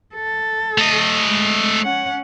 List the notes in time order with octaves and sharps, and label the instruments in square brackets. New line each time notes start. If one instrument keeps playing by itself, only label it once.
[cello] A4
[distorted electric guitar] A3 D#5
[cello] G#3
C#4 F#5